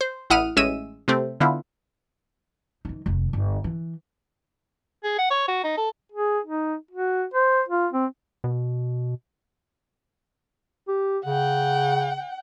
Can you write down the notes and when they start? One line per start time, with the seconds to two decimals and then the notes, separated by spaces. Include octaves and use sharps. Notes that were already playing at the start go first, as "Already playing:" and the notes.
0.01 C5
0.30 A1 E4 F#5 D#6 F6 D#7
0.57 A1 G#3 C#4 E5 E6 D#7
1.08 C3 A3 C4
1.40 D3 B3 E4 F4
2.85 E3 D#4
3.06 F1 D#2
3.33 G1
3.64 E3
5.04 G#4
5.18 F#5
5.30 C#5
5.48 F#4
5.63 D#4
5.77 A4
6.12 G#4
6.45 D#4
6.91 F#4
7.34 C5
7.69 F4
7.93 C4
8.44 B2
10.88 G4
11.25 C#3 F#5 G5